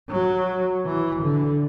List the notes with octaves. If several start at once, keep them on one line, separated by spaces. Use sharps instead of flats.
F#3
E3
D3